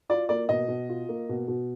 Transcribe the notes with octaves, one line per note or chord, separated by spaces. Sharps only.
F4 D5
A#3 D5
B2 D#5
B2
F4
A#3
B2
B2